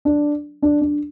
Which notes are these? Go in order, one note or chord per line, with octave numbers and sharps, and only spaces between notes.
D4
D4
D4